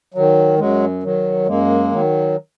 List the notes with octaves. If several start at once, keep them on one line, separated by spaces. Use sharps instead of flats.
D#3 F#3
F#2 F#3 G#3
D#3 F#3
F#2 G#3 A#3
D#3 F#3